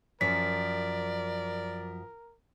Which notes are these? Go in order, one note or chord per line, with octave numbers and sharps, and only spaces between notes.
F#2 F3 A#4 D5 B6